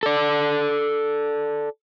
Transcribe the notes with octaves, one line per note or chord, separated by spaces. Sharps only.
A4 D5